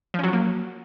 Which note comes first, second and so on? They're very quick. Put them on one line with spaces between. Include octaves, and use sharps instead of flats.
F3 C#4 F#3 F#4 A#3